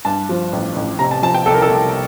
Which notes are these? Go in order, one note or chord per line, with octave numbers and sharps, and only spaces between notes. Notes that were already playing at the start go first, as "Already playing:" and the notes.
G2 A5
F3
A1
A1
C3 A#5
A5
F3 A5
G5
C2 A4
A#4
A4
C2